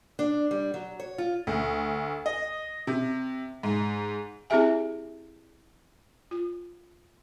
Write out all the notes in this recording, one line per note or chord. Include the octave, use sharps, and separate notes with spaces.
D4
G3
F#3
C#5
F4
D2
D#5
C3
G#2
C4 E4 G4 G#4 E5 G#5
F4